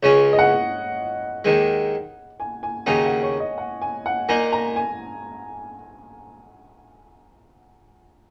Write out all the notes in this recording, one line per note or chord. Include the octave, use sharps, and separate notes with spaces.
C#2 C#3 G#3 C#4 C#5
D#5
F#5
D#2 D#3 G#3
G#5
G#5
D#2 C#3 F#3 D#4 G#5
F#5
C#5
D#5
F#5
G#5
F#5
A#2 A#3 D#4 G#5
A#5
G#5